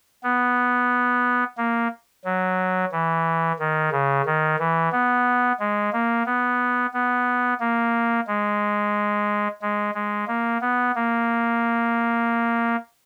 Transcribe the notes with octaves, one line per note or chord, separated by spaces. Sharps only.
B3
A#3
F#3
E3
D#3
C#3
D#3
E3
B3
G#3
A#3
B3
B3
A#3
G#3
G#3
G#3
A#3
B3
A#3